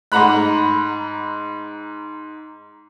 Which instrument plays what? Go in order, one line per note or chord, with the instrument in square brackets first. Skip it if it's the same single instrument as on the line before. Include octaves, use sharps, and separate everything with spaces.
[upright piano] G#2 F#5 A#5 B5 F#6